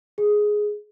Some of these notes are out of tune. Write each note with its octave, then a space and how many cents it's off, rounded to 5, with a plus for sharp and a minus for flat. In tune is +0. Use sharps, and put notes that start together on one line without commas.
G#4 +5